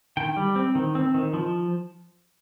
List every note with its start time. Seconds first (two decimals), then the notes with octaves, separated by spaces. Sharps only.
0.17 D#3 G5
0.36 G3
0.56 C4
0.75 D#3
0.95 C4
1.14 D#3
1.33 F3